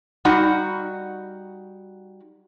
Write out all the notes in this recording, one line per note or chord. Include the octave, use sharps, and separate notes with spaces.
G3 D#4 F#4 F#5